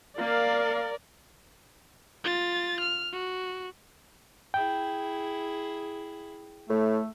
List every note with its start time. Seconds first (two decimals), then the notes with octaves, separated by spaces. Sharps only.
0.18 A#3 A#4 D5 F5
2.24 F4 A6
2.80 F6
3.13 F#4
4.54 E4 G#4 G5
6.69 A2 A3